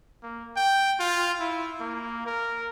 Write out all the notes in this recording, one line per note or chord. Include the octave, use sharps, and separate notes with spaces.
A#3
G5
F4
E4
A#3
A#4